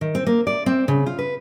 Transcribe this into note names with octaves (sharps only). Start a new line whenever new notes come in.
D#3
C4
A#3
D5
C4
C#3
F4
B4